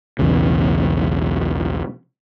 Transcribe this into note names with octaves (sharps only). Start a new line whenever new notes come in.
B1 E2 A2 C#3